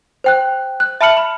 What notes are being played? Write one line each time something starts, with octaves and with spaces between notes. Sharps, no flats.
C5 G5 F#6
F#6
E5 A5 B5 F6 C#7 F#7
B5